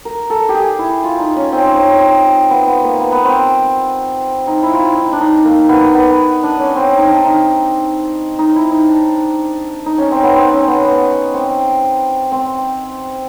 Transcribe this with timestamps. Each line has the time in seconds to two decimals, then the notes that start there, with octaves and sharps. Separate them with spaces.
0.05 A#4
0.30 A4
0.49 G4
0.55 G#4
0.79 E4
1.04 F4
1.20 D#4
1.36 C#4
1.52 C4
1.64 C#4
1.75 C4
2.50 B3
2.67 B3
2.83 A#3
3.00 B3
3.12 B3
3.24 C4
4.47 D#4
4.63 E4
4.73 F4
4.79 E4
4.96 D#4
5.12 D4
5.20 D#4
5.45 A#3
5.69 B3
5.94 B3
6.43 D4
6.59 C#4
6.76 C4
6.97 D#4
7.09 D4
7.25 D#4
8.39 D#4
8.56 E4
8.71 D#4
8.88 D4
9.86 D#4
9.98 C#4
10.11 C4
10.23 B3
10.36 C4
10.52 C#4
10.68 B3
10.85 B3
11.34 C4
12.32 C4